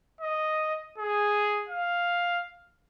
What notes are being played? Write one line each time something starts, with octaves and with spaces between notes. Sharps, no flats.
D#5
G#4
F5